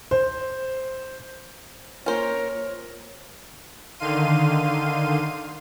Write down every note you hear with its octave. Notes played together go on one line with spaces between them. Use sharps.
C5
A#3 C#4 F4 A#4 C5 C#5
D3 D#3 F5 C6 D#7